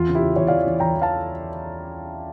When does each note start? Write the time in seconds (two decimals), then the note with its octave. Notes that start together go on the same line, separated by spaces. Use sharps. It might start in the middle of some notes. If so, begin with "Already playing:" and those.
Already playing: E2 F4
0.08 C#3
0.15 E4 G4
0.22 C#3
0.36 E2 C#5 E5
0.47 E3 D5 F5
0.67 E3
0.80 E2 G5 A#5
0.95 E3
1.02 F5 A5